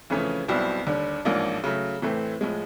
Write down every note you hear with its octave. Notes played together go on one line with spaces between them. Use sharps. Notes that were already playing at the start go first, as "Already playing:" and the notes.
F2 C#3 E3 A3 C#4
B1 B2 G3 C4 E4
D#2 D3 G3
A1 G#2 F3 A#3 D4
C#3 F#3 A3
A2 E3 A3 C4
A2 F3 G#3